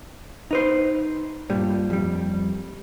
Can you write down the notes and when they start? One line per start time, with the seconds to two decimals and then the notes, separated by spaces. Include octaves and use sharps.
0.51 D#4 B4 C5
1.49 G2 A#2 G3
1.90 F2 G3